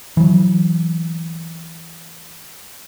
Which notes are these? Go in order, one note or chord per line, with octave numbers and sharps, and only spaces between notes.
E3 F#3